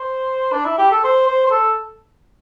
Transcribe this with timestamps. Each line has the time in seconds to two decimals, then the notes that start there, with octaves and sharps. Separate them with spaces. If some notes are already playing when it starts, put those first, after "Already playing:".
Already playing: C5
0.52 D4
0.65 E4
0.78 G4
0.92 A4
1.04 C5
1.27 C5
1.46 C5
1.51 A4